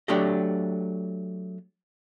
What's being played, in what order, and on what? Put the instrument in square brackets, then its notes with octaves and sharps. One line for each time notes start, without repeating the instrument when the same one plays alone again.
[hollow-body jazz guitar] F#3 A3 D4 G4 D#5